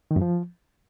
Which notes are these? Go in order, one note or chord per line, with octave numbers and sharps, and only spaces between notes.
D#3
F#2
F3